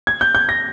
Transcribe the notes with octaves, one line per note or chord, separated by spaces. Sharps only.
G#6
G6
G6
A#6